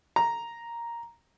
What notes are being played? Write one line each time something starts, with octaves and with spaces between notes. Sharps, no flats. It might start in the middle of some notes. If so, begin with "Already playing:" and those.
A#5